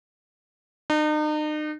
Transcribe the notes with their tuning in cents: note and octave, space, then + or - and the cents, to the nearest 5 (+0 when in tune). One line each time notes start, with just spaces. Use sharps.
D#4 -40